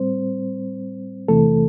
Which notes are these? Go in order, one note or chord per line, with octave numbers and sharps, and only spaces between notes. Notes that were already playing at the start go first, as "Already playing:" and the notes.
Already playing: A2 G3 C4 C5
E2 C3 E3 A3 A4